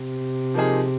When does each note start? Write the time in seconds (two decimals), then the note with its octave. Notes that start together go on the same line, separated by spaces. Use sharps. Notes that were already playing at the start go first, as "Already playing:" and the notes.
Already playing: C3
0.54 F3 A#3 D#4 G#4